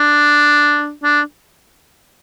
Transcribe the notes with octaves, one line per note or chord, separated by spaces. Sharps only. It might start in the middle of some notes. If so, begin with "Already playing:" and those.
Already playing: D4
D4